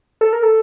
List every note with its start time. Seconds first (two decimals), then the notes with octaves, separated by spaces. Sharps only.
0.21 A4
0.33 A#4
0.43 A4